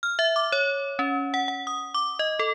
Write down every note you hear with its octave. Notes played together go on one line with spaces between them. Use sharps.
F6
E5
D6
C#5
C#4
F#5
F#5
D#6
D6
D#5
A4